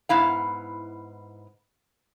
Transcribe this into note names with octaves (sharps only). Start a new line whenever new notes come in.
G#2 B3 E4 F5